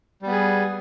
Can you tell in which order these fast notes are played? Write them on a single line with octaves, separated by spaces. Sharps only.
G3 B3 G#4